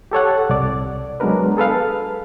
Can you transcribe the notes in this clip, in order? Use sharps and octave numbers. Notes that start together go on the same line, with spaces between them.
G4 A4 C#5 F#5
C2 D5
F#3 G#3 B3 D4 A#4 B4
G#4 A4 B4 F5